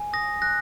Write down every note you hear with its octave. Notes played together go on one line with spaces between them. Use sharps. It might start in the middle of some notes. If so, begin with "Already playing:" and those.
Already playing: G#5
D#6 A#6
F#6 A#6